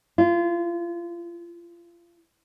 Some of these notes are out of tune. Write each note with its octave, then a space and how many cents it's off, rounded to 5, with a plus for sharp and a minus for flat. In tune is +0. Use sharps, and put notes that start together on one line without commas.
F4 -30